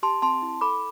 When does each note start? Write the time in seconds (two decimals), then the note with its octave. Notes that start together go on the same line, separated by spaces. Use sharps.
0.03 G4 A5 C6
0.22 C4 A5 C6
0.42 E4
0.61 A4 B5 D6